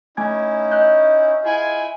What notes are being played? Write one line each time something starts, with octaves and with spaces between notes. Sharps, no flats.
A3 C#4 D#4 E4 G#5 G#6
D#5 F#6 G6
E4 F4 G#4 G#5